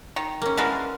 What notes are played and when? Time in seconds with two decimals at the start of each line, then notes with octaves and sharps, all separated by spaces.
0.16 D#3
0.42 A#3 C#4
0.57 D3 E3 G#3 A#4 B4 F5